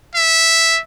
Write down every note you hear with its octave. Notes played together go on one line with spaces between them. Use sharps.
E5